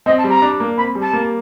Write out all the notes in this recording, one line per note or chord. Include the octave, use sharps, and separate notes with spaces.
C4 D#5
A5
G3
A#5
D4
A#3
C4 B5
G3
A5
A#3